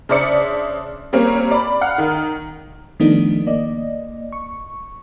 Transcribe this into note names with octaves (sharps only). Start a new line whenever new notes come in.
C#3 D4 C5 D5 E5 C#7
G3 A#3 C4 C#4
D5 B5
F5 F#5 F6
D#3
D#3 F3 A3 B3 D4 D#4
A#3 D5 D#5
C#6